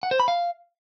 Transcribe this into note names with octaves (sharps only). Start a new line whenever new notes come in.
F#5
C5
B5
F5